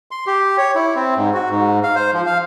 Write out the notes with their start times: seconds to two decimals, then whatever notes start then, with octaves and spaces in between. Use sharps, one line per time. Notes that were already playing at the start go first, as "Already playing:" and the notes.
0.11 C6
0.27 G4
0.58 C#5
0.75 E4
0.96 C4
1.17 G#2
1.34 F#4
1.50 G#2
1.83 F5
1.95 C5
2.13 F3
2.26 F5